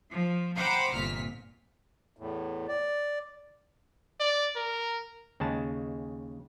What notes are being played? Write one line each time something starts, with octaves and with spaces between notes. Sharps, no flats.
F3
C5 F#5 G5 A#5 B5 D6
G1 C2 A#2 F6 B6
E2 A2
D5
D5
A#4
D#2 C#3 G#3 A5